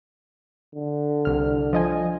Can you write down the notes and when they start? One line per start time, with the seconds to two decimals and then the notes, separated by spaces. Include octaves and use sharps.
0.75 D3
1.25 C2 F6
1.73 F3 D#5 G#5